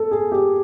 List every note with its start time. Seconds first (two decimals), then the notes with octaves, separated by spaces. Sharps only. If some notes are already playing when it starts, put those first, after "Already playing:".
Already playing: A4
0.11 G#4
0.32 G4